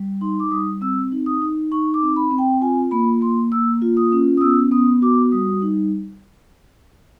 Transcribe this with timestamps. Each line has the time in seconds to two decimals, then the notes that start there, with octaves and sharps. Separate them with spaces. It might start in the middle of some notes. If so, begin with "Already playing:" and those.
Already playing: G3
0.21 D#4 C6
0.40 D6
0.51 G3 D#6
0.81 C4 E6
1.12 D#4
1.26 D#6
1.42 D#4
1.72 D#4 C#6
1.94 D6
2.02 C4
2.16 B5
2.31 C4
2.38 G5
2.61 F4 G#5
2.91 A#3 B5
3.21 A#3 C6
3.51 A#3 E6
3.82 F4
3.97 D#6
4.12 C#4
4.37 D#6
4.41 B3 E6
4.72 B3 D#6
5.02 F#4 D6
5.32 G3 D#6
5.62 D#4